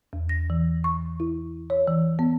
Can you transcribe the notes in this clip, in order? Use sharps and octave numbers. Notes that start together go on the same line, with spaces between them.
E2
A#6
E3
C#6
E4
C#5
E3
B3